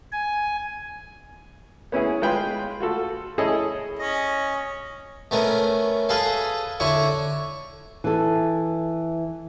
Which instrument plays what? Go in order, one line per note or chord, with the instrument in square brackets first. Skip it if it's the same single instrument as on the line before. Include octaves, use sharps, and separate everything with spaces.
[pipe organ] G#5
[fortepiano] B3 C#4 E4 G#4
G#3 F4 B4 F5 G5 B5
F4 F#4 A4
C#4 E4 G#4 A4 D#5
[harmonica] C#4 [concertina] D#5
[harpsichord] A3 B3 C#4 A#4
G#4 A4 B4 F5
D3 E4 C#5 C#6
[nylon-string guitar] E3 A4